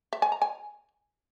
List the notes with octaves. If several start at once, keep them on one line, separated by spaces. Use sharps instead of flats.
E5
G#5
A#5
G#5